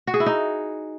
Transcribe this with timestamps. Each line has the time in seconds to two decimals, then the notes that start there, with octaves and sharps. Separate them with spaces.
0.07 F#4
0.14 G#4
0.20 E4
0.26 D#4